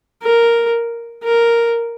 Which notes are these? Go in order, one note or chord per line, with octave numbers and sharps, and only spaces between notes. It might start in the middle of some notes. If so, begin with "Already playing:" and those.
A#4
A#4